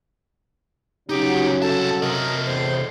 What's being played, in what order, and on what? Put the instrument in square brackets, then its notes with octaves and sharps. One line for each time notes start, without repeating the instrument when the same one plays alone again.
[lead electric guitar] C2 D#4 [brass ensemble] C#3 F#3 [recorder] G4
[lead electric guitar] C2 A5 [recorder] A4
[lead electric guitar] C3 D#5 [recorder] A#4
[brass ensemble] E2 A2 D3 [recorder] C5